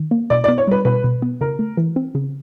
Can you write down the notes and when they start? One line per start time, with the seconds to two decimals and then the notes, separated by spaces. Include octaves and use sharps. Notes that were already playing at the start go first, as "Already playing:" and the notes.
Already playing: D#3
0.11 A#3
0.30 B2 D5
0.44 D5
0.48 B3
0.58 C#5
0.67 G3 B4
0.85 B2 B4
1.04 B2
1.22 B3
1.41 C#3 A#4
1.59 A3
1.77 E3
1.96 C4
2.15 C#3